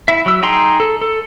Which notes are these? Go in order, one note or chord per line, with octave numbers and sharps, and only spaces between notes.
E4 E5
F#3 E6
D#4 G#4 G5 A#5 C6
A4
A4